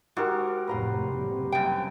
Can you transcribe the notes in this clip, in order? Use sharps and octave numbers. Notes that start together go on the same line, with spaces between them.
G#2 F#4 G4 A#4
F1 A2 B4 A#5 C6
F#1 C3 G3
F#2 G5 G#5